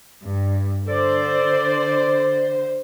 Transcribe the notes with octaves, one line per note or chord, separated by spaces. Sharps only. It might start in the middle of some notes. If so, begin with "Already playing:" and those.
G2
D3 A4 C5 D5